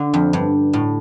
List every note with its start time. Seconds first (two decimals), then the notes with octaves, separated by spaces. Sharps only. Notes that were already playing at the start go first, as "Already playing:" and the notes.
Already playing: D3
0.14 F2
0.33 G2
0.73 A2